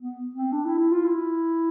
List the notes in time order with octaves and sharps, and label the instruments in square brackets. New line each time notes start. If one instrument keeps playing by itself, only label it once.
[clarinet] B3
C4
D4
E4
E4
F4
E4